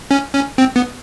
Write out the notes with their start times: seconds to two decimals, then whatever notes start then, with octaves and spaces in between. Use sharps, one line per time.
0.11 C#4
0.33 C#4
0.58 C4
0.76 B3